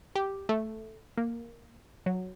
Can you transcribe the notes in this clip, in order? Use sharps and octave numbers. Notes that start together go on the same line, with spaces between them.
G4
A3
A#3
F#3